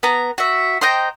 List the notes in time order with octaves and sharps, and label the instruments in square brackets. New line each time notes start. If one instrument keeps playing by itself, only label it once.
[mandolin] B3 A#5
F#4 E5
C5 D#5 G5 A#5